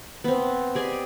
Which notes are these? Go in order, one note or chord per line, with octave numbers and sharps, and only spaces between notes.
B3 C4
G4 G#4 D5 D#5